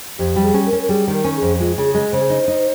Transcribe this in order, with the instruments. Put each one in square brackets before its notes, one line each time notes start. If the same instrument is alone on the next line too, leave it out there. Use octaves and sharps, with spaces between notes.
[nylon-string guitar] F2 [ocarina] G4
[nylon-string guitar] G3
[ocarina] G#4
[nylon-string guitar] C#4
[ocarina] A#4
[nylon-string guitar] C#4
[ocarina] A#4
[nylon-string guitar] G3 [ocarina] G#4
[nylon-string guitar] D#3
[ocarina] A#4
[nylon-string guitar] C#4
[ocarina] G#4
[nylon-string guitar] F2
[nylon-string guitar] G#3 [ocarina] F4
[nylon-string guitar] C#3 [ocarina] G#4
[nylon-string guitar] G#3
[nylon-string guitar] C#3 [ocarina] C5
[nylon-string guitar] D#4
D#4